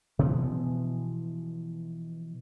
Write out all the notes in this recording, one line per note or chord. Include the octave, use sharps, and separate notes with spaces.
B2 E3 F3 B3